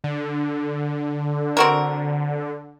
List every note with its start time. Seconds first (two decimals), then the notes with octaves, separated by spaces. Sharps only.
0.04 D3
1.57 C4 F#4 A#4